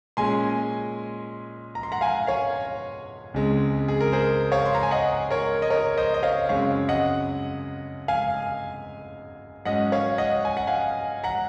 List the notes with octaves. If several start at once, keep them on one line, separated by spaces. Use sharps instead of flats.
A#2 G#3 C#4 G#5 C6
A#5
C6
F#5 A#5
F5 G#5
C#5 F5
C#2 C#3 G#3 C4
G#4
A#4
G#4 C5
C#5 F5
C6
A#5
G#5
D#5 F#5
A#4 C#5
D#5
A#4 C#5
C5 D#5
D#5
C#5 F5
F#2 C#3 G#3 C4 C#5 F5
D#5 F#5
F5 G#5
G#2 F#3 C#4 D#5 F#5
C#5 F5
D#5 F#5
G#5
F#5
F5 G#5
F#5 A#5